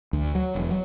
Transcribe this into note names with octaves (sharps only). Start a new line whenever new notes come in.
D2
F#3
E1
F#3